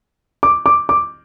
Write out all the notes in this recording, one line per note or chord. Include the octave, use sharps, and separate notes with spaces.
D6
D6
D6